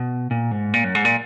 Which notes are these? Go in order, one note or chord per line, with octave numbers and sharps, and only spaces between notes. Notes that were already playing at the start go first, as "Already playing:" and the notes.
Already playing: B2
A#2
G#2
A#2
F#2
G#2
A#2